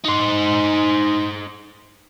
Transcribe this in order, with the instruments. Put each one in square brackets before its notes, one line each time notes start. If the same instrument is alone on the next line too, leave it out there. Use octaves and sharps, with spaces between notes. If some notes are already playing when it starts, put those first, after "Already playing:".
[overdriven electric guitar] D#4 C5